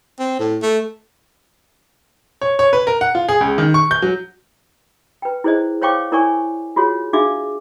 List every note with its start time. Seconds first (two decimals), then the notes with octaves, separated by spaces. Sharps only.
0.19 C4
0.39 A2
0.62 A3
2.42 C#5
2.59 C#5
2.73 B4
2.87 A#4
3.01 F#5
3.15 F4
3.28 G#4
3.41 C#2
3.58 D#3
3.74 C#6
3.91 G6
4.02 F#3
5.22 B4 G5
5.44 E4 G#4 C5 D5 D#5
5.82 C5 C#5 F5 G5 C#6 D6
6.12 E4 A#4 C#5 D5 G#5 C#6
6.76 F4 F#4 G#4 C#5
7.13 D4 F#4 G#4 E5 F5 D6